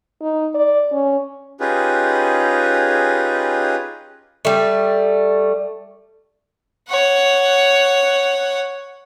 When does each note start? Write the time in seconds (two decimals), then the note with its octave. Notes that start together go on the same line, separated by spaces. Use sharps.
0.22 D#4
0.55 D5
0.93 C#4
1.60 C#4 D#4 F4 G4 G#4 B4
4.45 G3 A3
6.89 C#5 F#5